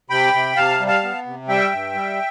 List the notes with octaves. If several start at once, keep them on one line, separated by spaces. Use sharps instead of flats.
C3 G5 B5
C3
C3 F5 A5
G3
F5 A5
B3
C3
G3 E5 G5
G2
G3